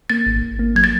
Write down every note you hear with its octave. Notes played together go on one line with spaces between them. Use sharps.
A#3 A6
G#1
G#1
A#3
F#3 G#6
A6